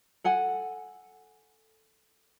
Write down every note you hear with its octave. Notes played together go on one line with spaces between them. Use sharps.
A4 F#5 G#5